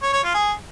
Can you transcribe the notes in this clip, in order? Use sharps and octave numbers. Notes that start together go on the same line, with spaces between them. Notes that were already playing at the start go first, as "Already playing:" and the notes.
C#5
C#5
F4
G#4